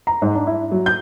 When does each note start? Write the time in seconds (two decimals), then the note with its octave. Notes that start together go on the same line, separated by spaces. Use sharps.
0.07 A#5
0.22 G#2
0.35 D4
0.47 E4
0.71 F#3
0.86 G6